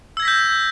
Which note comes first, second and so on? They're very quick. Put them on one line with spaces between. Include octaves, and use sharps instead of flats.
E6 G#6 A#6 B6 G6